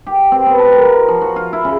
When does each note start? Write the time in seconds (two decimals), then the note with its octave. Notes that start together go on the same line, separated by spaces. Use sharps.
0.07 G4
0.32 C4
0.46 B3
0.59 A5
0.72 A#4
0.85 F4
1.08 F3
1.21 F#4
1.36 F4
1.53 E4
1.65 C#3